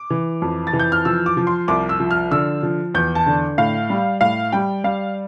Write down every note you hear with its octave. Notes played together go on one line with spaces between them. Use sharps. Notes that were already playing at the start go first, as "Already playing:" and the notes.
Already playing: D6
E3
F2
A6
E3
G6
F6
F3 E6
D6
F3
C6
C2 D6
E6
F3
F6
D3 E6
F3
E2 G6
A5
D3
A2 F5
G3
A2 F5
G3 G5
G3 F5